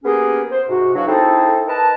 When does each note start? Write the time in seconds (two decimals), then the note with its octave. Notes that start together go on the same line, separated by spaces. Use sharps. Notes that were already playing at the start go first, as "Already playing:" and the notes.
0.04 A#3 B3 C#4 G4 G#4
0.51 C5
0.67 G#2 C3 F#4
0.95 E2 F#3 D4 F#4 C#5 F5
1.06 A3 C4 D#4 E4 G#4 A4
1.67 A#4 B4 D#5 A5